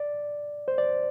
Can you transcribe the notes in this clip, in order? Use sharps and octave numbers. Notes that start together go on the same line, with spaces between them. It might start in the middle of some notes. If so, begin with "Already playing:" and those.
Already playing: D5
C5
D5